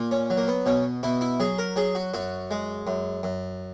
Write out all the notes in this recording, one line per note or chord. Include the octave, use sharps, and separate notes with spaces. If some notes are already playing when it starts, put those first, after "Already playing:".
Already playing: A#2
C#4
F#3
A#3
B3
B2 C#4
B2 E4
E4
F#3 G#4
A#4
F#3 G#4
F#4
F#2 F#4
G#3
F#2
F#2